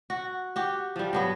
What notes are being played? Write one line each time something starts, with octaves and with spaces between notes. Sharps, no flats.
F#4
F#4 G4
F3 G3
G2 F#3 B3